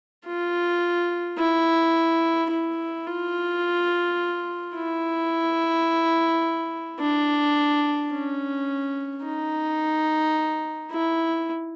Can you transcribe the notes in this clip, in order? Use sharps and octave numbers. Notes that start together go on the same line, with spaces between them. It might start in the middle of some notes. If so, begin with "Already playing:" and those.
F4
E4
E4
F4
E4
D4
C#4
D#4
E4